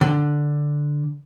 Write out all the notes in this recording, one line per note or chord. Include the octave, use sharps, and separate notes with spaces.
D3